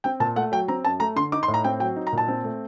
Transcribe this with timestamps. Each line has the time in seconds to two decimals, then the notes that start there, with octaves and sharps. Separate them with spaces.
0.04 C4 G5
0.20 A#2 A5
0.36 A3 F#5
0.52 F#3 G5
0.68 C4 A#5
0.84 F#2 A5
1.00 A3 A#5
1.16 D3 C6
1.32 D#4 D6
1.43 C6
1.48 A2
1.54 A#5
1.64 C4 G5
1.80 F#3 G5
1.96 D#4
2.07 A#5
2.12 A#2
2.18 A5
2.28 C4
2.44 A3